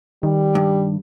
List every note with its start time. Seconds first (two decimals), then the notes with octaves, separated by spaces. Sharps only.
0.23 D#3 G3
0.55 G2